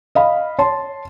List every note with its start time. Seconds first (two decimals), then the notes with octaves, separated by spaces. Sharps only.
0.15 D#5 F5 B5
0.59 C#5 A5 C6